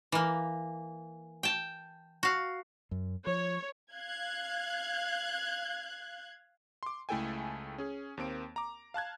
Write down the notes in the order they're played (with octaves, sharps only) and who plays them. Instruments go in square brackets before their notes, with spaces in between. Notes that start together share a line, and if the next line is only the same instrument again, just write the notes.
[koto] E3 A#3
G5 A5
F#4 F5
[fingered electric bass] F#2
[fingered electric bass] F3 [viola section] C#5
[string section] F5 F#6 G#6
[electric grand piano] C6 D6
C#2 A3 E4 A4 G5 G#5
C#4 G#4
D#2 A#3 C4 D7
A#5 D6
F5 A5 F#6 G#6